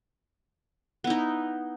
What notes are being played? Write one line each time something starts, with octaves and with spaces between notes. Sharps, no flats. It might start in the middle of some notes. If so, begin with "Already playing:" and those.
B3 D#4 E4